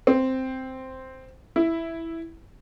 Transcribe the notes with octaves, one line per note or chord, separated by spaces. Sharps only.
C4
E4